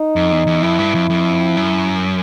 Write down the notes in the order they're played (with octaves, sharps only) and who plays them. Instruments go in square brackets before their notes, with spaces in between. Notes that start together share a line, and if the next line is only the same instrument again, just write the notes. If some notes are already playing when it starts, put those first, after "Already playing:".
Already playing: [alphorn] D#4
[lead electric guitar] F2
E2
E2
[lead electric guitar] F2 [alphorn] E4
[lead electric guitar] G2
F2
F2
F#2